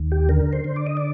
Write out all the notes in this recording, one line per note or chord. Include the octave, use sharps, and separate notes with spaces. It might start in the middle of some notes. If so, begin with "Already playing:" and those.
Already playing: D#2
G4
D3 A#4
C5
D3
D5
D#5
D5